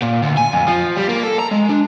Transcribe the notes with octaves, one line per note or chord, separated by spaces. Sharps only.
A#2
D2
G#5
F2
F3
G3
A#3
A4
A#5
G#3
D4